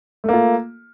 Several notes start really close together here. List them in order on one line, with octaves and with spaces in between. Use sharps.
A3 A#3 F4